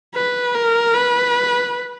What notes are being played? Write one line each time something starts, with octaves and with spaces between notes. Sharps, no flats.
B4
A#4
B4